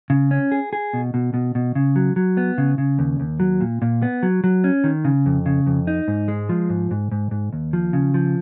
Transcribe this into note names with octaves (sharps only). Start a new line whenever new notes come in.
C#3
C#4
G#4
G#4
B2
B2
B2
B2
C#3
F#3
F#3
B3
C#3
C#3
D#2
D#2
F#3
A#2
A#2
B3
F#3
F#3
C#4
D#3
C#3
F2
C#3
F2
D#4
G#2
G#3
F3
G#2
G#2
G#2
G#2
D#2
F3
C#3
F3